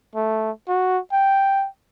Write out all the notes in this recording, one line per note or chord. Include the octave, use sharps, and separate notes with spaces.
A3
F#4
G5